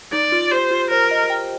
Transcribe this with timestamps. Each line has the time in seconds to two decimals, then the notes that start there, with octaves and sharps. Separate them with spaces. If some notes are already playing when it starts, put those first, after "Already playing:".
0.13 D#4 D5
0.32 F4
0.51 G4 C5
0.71 F4
0.91 A#4 C5
1.11 D#5
1.30 G5